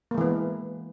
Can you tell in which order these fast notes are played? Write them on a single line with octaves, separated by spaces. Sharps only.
A#3 G#3 E3 B3